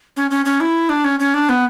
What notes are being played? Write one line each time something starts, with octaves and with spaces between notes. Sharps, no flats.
C#4
C#4
C#4
E4
D4
C#4
C#4
D4
B3